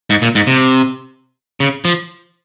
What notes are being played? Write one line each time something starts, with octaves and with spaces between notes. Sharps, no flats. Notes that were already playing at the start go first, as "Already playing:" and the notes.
G#2
A#2
G#2
C3
C#3
F3